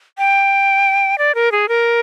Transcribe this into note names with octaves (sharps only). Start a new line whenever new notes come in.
G5
D5
A#4
G#4
A#4